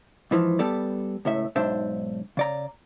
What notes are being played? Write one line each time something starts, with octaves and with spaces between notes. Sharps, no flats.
G#2 E3 F3
G3 B3 A4 D5
C#2 A2 E5
B1 G#2 D4 C5 E5
C#3 D5 A#5